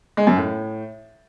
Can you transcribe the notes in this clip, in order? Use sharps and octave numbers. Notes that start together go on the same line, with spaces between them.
G#3
F#2
A2